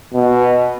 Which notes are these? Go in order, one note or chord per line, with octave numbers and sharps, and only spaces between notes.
B2